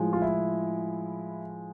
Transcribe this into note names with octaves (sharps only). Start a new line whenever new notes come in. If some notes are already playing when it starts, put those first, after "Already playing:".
Already playing: A2 F3 G#3
F4
E4